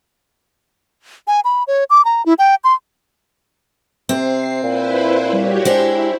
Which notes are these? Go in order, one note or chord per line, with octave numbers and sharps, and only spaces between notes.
G#5
B5
C#5
D6
A#5
E4
G5
C6
C3 C4 C7
A#2 E4 B4 C5
G3 F#4 G4 C#5
G#3 D4 E4 G4 C5